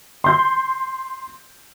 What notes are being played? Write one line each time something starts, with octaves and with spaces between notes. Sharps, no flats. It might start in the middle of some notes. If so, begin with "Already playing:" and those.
C6 G6